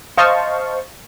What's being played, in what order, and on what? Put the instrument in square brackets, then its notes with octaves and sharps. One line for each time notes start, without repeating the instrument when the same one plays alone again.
[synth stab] C5 D#5 F5 A5 C#6